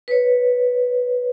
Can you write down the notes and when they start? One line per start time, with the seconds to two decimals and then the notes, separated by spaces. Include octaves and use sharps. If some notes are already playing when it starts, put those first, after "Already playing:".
0.08 B4 C#5